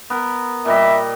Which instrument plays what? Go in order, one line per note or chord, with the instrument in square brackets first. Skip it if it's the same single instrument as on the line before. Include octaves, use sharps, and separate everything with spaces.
[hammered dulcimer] B3 A#4
[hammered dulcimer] A#2 G3 D#5 [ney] E5